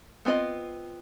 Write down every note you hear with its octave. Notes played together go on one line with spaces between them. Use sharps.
B3 C4 F4 D5 D#5